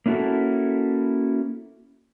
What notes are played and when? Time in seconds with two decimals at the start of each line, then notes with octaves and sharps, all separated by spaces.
0.06 A#3 C#4 E4 F#4 A4